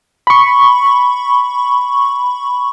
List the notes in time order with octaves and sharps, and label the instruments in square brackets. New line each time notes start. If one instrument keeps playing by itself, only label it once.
[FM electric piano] B5 C#6